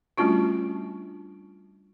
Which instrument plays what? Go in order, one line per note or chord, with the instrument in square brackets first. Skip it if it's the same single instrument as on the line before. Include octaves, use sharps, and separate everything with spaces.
[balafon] G3 A3 C#4 D4 F4 F#4